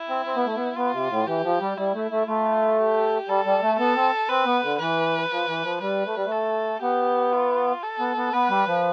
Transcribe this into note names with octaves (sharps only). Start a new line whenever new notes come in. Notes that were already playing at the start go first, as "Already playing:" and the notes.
Already playing: E4
C4
C4
B3
A3
B3
B3 F4
C3
A2
E3 G4
F3
G3
G3 E4
A3
A3
A3 F4
G4
G3 A4
G3
A3
B3 A4
C4
C4 B4
B3
D3
E3 B4
F3
E3
F3
G3 B4
A3
G3
A3
A4
B3 G4
F4
A4
B3
B3
B3 B4
G3
F3